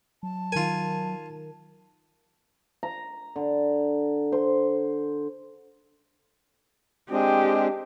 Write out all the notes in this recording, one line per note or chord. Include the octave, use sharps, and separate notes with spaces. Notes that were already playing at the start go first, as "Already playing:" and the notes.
F#3 A5
D#3 F4 A#4 G#5
A#5
D3
C5
G#3 C4 D4 G4 D#5